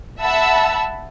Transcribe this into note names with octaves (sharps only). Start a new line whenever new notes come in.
E5 F#5 A5 B5 E6